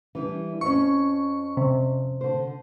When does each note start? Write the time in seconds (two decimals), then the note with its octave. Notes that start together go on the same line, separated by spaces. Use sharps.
0.15 E3 G3 D4
0.61 F2 C#4 C#6
1.57 C3
2.21 D3 C5